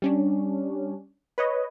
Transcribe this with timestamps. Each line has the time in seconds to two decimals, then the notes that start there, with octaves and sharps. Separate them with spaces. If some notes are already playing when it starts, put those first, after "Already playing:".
0.02 G3 C#4 D4
1.38 B4 C#5 D#5